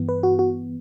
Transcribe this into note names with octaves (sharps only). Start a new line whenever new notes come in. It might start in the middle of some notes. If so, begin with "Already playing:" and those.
Already playing: G2 E3 B3
B4
F#4
F#4